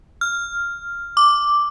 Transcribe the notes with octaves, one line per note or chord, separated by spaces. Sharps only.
F6
D6